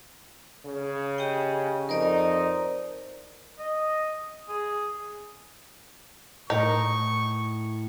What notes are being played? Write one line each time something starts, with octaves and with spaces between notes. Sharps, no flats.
C#3
G4 D#5 G5
F2 D#4 A#4 C5 D5
D#5
G#4
A2 D#4 A#4 C#6